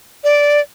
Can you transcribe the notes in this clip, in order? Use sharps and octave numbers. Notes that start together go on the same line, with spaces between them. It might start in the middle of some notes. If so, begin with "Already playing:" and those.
D5